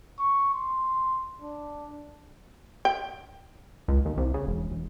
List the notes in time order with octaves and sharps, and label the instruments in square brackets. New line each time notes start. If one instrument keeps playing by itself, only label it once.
[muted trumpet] C#6
C6
D4
[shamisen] G5
[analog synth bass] C#2
D#2
C2
C#3
E1
E1